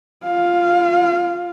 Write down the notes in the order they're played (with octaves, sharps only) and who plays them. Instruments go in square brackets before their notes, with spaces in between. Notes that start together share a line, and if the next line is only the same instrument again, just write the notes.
[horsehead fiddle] F4 F5